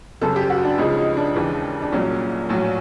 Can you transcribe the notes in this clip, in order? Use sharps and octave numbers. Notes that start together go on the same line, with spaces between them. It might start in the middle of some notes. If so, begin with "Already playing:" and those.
G1 F#2 C#3 A4
G4
F#4
D4
C#2 C#3 F3 D#4
D#4
D4
D#2 C#3 E3
D4
C2 A#2 F#3 C#4
A#1 A2 F#3